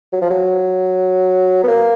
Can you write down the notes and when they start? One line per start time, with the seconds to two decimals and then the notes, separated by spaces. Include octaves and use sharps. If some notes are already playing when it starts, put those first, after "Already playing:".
0.13 F#3
0.22 F3
0.31 F#3
1.63 B3
1.68 A#3